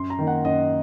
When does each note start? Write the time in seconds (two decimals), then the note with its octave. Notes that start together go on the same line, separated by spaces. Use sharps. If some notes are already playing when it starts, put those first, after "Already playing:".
Already playing: F#2 C6
0.10 A#5
0.19 D#3 A#3
0.27 F#5
0.44 F#2 D#5